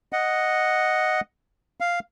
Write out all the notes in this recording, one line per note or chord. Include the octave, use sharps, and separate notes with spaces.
D#5 F#5
F5